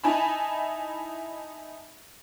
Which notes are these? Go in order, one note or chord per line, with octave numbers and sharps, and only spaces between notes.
D#4 E4 G#5 A5 B5